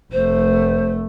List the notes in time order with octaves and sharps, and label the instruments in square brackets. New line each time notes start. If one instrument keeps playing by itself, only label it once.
[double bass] F1 A3 [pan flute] C5